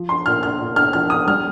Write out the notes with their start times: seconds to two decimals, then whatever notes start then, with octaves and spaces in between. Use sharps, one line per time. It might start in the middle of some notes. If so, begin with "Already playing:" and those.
Already playing: F3
0.09 C6
0.26 A#2 F6
0.43 F6
0.60 A#2
0.76 F6
0.93 F3 F6
1.10 D#6
1.27 G3 F6